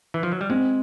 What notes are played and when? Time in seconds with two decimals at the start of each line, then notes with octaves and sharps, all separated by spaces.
0.14 E3
0.23 F3
0.32 F#3
0.41 G3
0.49 G#3 C4